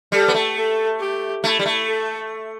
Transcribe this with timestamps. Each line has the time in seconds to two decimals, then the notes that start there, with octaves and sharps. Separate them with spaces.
0.12 G3 A4
0.28 B3
0.34 A3
0.56 A4
1.00 G4
1.43 A3 E4
1.59 G3
1.66 A3
1.87 A4